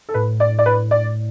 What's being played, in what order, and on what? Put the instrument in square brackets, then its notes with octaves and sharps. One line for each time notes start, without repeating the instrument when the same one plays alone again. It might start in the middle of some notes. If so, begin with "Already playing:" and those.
[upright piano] A4
[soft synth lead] A2 [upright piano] B4
[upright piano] D5
D5
B4
D5